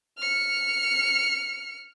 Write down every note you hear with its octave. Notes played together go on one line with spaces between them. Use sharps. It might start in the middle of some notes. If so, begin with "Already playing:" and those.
F6 C#7